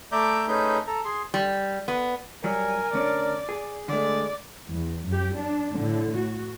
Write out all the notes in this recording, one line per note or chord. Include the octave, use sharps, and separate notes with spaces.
A3 D5 E5 A#5 D6 G6
A3 C#4 D#4 G#4 B4 G6
A4 A#5
G#4 C6
G3
B3
F#3 G3 A#4 G#5
D2 C#4 D4 D5
G#4
D3 G#3 A3 D5
E2
F#2 G4
D4
A2 D3
F#4